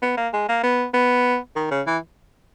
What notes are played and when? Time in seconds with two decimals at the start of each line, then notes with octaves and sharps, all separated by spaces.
0.02 B3
0.17 A#3
0.33 G#3
0.49 A#3
0.63 B3
0.94 B3
1.56 D#3
1.71 C#3
1.87 E3